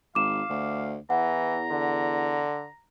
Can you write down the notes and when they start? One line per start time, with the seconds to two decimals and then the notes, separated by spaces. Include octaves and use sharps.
0.15 G#1 F5 D6 E7
0.50 D2
1.10 E2 E3 F#5 A#5
1.71 D3